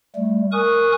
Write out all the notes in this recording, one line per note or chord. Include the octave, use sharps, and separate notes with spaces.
G3 A3
A#4 G#5 C#6 D#6 F#6